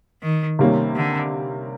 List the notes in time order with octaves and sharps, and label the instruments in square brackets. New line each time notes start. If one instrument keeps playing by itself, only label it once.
[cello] D#3
[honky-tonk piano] C3 D#3 G3 A#3 C#4
[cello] D3